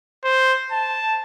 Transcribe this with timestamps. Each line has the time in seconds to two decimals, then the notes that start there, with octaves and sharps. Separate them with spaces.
0.24 C5
0.72 A5